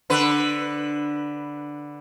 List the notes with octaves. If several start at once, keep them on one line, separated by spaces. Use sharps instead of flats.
D3 B4